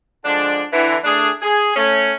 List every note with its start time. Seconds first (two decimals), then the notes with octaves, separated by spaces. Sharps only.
0.25 D3 F3 G#3 D4
0.73 D3 E3
1.04 A3 D4 G#4
1.42 G#4
1.76 A3 C#4